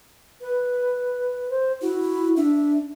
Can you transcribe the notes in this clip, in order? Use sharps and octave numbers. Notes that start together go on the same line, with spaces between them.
B4
C5
E4 F#4
D4 E5